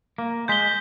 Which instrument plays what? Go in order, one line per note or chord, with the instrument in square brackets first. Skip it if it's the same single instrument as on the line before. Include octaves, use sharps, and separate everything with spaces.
[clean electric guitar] A#3
[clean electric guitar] G#3 [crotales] G6 B6 G7